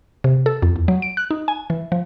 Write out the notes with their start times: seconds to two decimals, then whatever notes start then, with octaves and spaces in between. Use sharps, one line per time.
0.24 C3
0.46 A4
0.62 F2
0.76 E2
0.88 F#3
1.02 D7
1.17 F#6
1.31 D#4
1.48 G#5
1.70 E3
1.92 F3